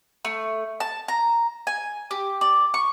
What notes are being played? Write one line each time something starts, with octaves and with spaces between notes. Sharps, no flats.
A3
A5
A#5
G#5
G4
D5
C#6